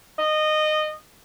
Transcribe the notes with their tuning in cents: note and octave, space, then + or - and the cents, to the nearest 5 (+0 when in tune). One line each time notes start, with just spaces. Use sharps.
D#5 -20